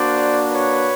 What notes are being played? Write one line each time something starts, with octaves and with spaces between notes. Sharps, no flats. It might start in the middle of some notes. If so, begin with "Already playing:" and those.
Already playing: A#3 D4 F#4 C5 D5
B4 C#5